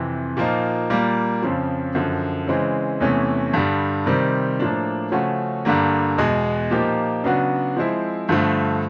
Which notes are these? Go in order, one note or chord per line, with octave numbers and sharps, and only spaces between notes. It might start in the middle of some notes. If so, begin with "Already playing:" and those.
Already playing: F2 C3 E3
A#2 F3 A#3 D#4
A#2 G3 A#3
F2 C#3 F3
F#2 D3 F3
C#3 E3 G#3 C4
E2 C3 E3 A3 C#4
G2 D3 G3
C3 D#3 G3 C4
A2 F3 A#3 D4
C#3 F3 A3 C#4 F#4
G2 D3 G3 A#3
E2 B2 G#3
A#2 F3 A#3 D#4 G4
C#3 F#3 B3 D4 F#4
F3 G#3 C4 E4
G2 D3 F3 A3